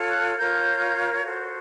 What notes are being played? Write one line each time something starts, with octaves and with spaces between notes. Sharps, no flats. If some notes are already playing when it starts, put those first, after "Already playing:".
Already playing: F4 A4 C#5
F#6
F4 A#4 C#5 G6
F#4 A4 C5